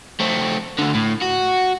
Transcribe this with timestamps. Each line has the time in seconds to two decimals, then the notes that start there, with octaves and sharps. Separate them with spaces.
0.20 A3 C4
0.78 D2 D3
0.94 A2
1.22 F#4